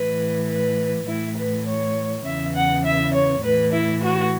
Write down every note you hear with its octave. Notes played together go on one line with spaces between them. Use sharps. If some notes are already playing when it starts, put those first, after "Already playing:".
Already playing: A2 E3 B4
B4
A2 E3 E4
B4
C#5
E2 C#3 E3 E5
F#5
E5
C#5
A2 E3 B4
E4
F#4